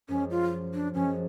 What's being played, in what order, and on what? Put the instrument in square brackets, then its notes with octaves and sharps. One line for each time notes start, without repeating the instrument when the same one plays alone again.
[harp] F#2 F3 G#3 [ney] C#4
[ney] F4
D4
[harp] F#2 F3 G#3 [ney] C#4